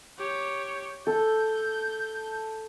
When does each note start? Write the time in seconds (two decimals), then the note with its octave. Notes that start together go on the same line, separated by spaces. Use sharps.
0.18 G4 C#5
1.07 A4 G6